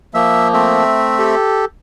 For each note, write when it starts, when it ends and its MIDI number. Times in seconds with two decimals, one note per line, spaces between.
0.14 0.84 53
0.14 0.84 58
0.14 0.48 76
0.53 1.35 57
0.53 1.35 60
0.53 1.35 76
1.18 1.65 67
1.18 1.65 69